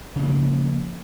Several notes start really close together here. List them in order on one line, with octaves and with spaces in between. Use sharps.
C#3 B3 A#3 F3